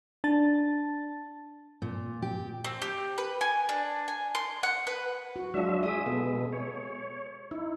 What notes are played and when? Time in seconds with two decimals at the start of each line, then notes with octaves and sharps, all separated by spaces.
0.24 D4 A5 A6
1.82 A#2
2.22 G4
2.64 C4
2.82 G4
3.18 B4
3.41 G#5
3.69 D4
4.08 G#5
4.35 C6
4.63 F#5
4.87 B4
5.36 F#4
5.54 F#3 G#3 D4 F4 E5
5.83 G#4 E5 D#6
6.06 B2 G#3 B3 A4
6.53 C#5
7.51 D#4 E4